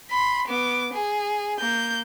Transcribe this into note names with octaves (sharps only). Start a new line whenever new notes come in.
B5 C6
B3 D6
G#4
A#3 G6